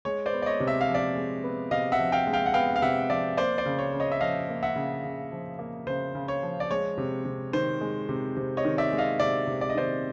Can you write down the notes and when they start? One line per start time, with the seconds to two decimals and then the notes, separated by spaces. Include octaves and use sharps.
0.05 G#3 C#5
0.26 C5 D5
0.33 B3
0.42 D5
0.46 C#5 D#5
0.60 C3
0.67 E5
0.81 F5
0.88 F3
0.94 D5 E5
1.16 G#3
1.44 B3
1.71 C3 D#5 F5
1.92 E5 F#5
1.99 F3
2.12 F5 G5
2.27 G#3
2.33 F5 G5
2.46 F#5
2.54 B3 F5 G5
2.76 F5
2.82 C3 E5 F#5
3.10 F3 D5 E5
3.37 A#3 C5 D5
3.58 C5 D5
3.66 C#3
3.79 C#5
3.93 C#3
4.00 C#5 D#5
4.12 E5
4.21 F3 D#5 F5
4.49 A#3
4.63 E5 F#5
4.76 C#3
5.04 C#3
5.32 F3
5.59 A#3
5.87 C#3 C5
6.15 C#3
6.28 C#5
6.43 F3
6.60 D5
6.71 G#3 C#5
6.98 C3
7.25 C3
7.53 D#3 C5
7.81 G#3
8.09 C3
8.36 C3
8.57 C#5 D#5
8.65 D#3
8.78 D5 E5
8.92 G#3
8.98 D#5 F5
9.20 C3 D5 E5
9.47 C3
9.61 D5
9.70 D#5
9.75 D#3 C5 D5